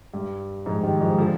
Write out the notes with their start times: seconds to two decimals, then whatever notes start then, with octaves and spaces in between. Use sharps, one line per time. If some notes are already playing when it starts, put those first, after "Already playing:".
0.14 G2
0.66 F2 G#2
0.83 D#3 G3
1.01 F3 G#3
1.18 D3 F3